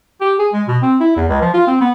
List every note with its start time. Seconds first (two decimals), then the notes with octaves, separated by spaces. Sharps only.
0.21 G4
0.39 G#4
0.53 G#3
0.68 B2
0.83 C4
1.00 E4
1.16 E2
1.29 C#2
1.42 F3
1.54 F4
1.67 C4
1.81 B3